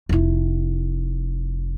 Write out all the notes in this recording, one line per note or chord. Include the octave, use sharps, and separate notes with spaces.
F1 E4